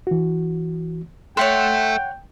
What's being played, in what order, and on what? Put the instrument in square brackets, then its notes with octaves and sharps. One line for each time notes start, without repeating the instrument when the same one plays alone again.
[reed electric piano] E3 F#4
[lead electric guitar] A4 E5 [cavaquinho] C#5 F#5 C6 [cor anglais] G5 [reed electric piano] F#6